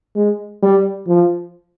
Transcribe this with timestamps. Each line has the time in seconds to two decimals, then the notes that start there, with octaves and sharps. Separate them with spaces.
0.16 G#3
0.63 G3
1.08 F3